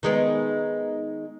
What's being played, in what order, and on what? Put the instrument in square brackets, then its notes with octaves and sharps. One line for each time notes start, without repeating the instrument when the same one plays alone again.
[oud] D#3 G#3 B3